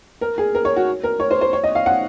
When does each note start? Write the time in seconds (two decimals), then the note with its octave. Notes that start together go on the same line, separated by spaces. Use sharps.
0.21 A#4
0.38 G#4
0.55 A#4
0.65 C#5
0.76 F#4
1.04 A#4
1.20 C#5
1.31 C5
1.41 C5
1.53 C#5
1.64 D#5
1.75 F5
1.86 F#5